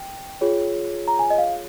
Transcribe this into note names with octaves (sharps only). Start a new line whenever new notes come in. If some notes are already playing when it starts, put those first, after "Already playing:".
Already playing: G5
F4 G#4 C#5
A#5
G#5
D#5
F5